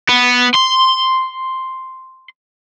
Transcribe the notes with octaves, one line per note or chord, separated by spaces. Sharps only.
B3
C6